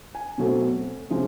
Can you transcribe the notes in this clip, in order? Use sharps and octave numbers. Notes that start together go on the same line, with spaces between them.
G#5
B2 F#3 A3 C4
C3 F3 G#3 C#4